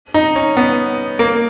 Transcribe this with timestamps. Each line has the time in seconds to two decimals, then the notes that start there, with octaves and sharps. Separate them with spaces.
0.14 D#4
0.36 C#4
0.57 B3
1.19 A#3